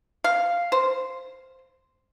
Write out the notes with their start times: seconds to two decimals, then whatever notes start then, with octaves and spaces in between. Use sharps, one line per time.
0.24 F5
0.72 C5